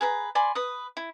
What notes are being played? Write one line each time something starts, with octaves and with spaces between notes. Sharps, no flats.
G#4 B4 A#5
D5 G#5 B5 C6
B4 D#6
E4